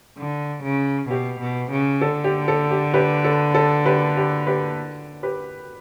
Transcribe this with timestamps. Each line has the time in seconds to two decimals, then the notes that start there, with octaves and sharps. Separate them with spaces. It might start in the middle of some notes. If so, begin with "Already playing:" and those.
0.17 D3
0.63 C#3
1.09 B2 G4
1.40 B2
1.71 C#3
2.01 D3 A4
2.24 G4
2.48 A4
2.71 G4
2.94 G4 B4
3.24 A4
3.55 A4
3.86 G4 B4
4.17 G4
4.47 G4 B4
5.23 G4 B4